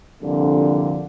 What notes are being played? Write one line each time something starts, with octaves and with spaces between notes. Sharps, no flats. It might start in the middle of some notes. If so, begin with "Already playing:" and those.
C2 F2 A#2 D3